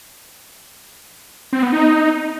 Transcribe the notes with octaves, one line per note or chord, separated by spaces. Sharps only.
C4
B3
D#4